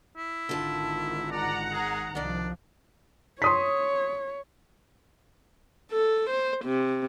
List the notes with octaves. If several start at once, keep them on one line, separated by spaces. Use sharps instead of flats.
E4
G#1 D3 D#3 F4 A5
D5 F#5 A#5
G#4
C2 D#3 F3 D4 D5
C#5 C6 D#6 B6
A4
C5
C3